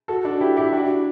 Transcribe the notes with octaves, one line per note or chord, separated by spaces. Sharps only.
F#4 A4
D4 F#4
E4 G4
E4 G4
D4 F#4